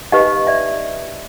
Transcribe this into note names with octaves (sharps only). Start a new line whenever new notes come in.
D#4 G4 B4 D#5 F5
D5 E5